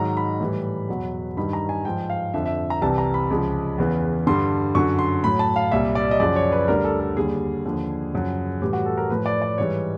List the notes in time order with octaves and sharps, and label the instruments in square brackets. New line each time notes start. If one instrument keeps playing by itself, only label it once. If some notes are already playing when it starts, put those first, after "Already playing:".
Already playing: [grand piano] G#2 D#3 F#3 A#5
B5
A2 E3 G3
E2 B2 F#3
G2 D#3 G3 B5
A#5
G#5
G#2 F3 G5
F5
F2 D3 F3 E5
E5
A#5
C2 C3 E3 G3 A5
A#5
B5
C#2 C#3 F3
E2 C#3 E3
G2 D3 G3 C6
F#2 D3 F#3 C#6
C6
A2 F#3 B5
A5
F5
C2 A#2 G3 E5
D5
D#5
F#2 C#3 F3 D5
C#5
B4
D2 D3 G3 A#4
A4
A4
D#2 D3 G3 G#4
D#2 D3 F3
F#2 C#3 F3
A2 E3 G3 G4
F#4
A4
A#4
A2 F3 B4
D5
D5
G#2 E3 G3 C#5